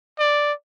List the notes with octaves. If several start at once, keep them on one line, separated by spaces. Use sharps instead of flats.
D5